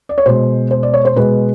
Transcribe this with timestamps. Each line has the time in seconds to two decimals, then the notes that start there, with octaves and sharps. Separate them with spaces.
0.09 D5
0.18 C#5
0.26 B2 G#3 C5
0.71 C5
0.83 D5
0.94 C#5
1.05 C5
1.16 B2 G#3 B4